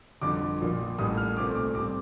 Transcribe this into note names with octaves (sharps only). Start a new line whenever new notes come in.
G1 F2 D3 F3 D6
A#1 A#2 F3 A#3
A1 A2 G3 A#3 D#6
F6
C2 A#2 A3 C4 D6
D6
A2 G3 C4 D6